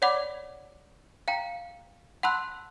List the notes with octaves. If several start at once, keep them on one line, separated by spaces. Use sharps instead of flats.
C#5 D5 F#5 B5 D6
F5 G5 A#5
F#5 A5 B5 C6 E6 F#6